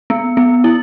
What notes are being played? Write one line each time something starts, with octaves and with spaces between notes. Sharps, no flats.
B3
B3
E4